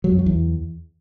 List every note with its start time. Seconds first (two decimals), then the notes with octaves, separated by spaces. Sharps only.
0.04 F#3
0.11 F2
0.19 F#3
0.26 E2